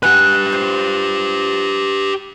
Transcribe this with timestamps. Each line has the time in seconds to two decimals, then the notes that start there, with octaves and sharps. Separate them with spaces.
0.03 G4 B4 F#5 G#5 F#6
0.50 F4 C5